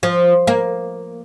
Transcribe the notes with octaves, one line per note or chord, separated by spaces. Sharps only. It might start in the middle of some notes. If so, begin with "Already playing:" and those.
F3
A#3